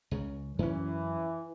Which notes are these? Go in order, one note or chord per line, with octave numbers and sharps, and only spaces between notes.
C#2 C#3
F#2 E3 C#4